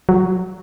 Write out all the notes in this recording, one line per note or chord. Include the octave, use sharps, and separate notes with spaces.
F#3